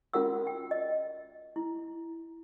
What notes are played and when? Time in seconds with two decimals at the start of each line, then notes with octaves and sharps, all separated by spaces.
0.13 C#4 F4 F#4 A#4 F#5 E6
0.47 G5
0.71 D#5
1.56 E4